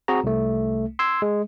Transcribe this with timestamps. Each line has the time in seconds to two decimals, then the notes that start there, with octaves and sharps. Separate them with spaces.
0.08 C4 F#4 G#4 A#5
0.24 C2 A3
0.99 C6 E6 G#6
1.22 G#3